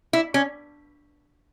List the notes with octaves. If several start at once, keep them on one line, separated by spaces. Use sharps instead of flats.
E4
C#4